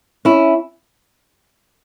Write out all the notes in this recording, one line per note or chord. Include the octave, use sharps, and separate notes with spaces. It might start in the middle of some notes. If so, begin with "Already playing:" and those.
C#4 E4